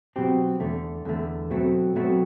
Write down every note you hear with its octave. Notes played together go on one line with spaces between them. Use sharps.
B2 F#3 C4 G4
E2 D3 A3
E2 D3 A3
B2 F#3 A3 C4
B2 F#3 A3 C4